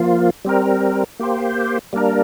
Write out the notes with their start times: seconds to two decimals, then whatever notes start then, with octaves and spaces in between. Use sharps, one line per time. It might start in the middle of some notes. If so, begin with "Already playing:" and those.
Already playing: F3 A#3 F4
0.45 G3 C4 A#4
1.20 A#3 G4 C5
1.93 G3 A#3 D4 A#4